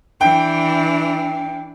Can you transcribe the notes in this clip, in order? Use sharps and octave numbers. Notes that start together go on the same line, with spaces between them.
E3 D4 G5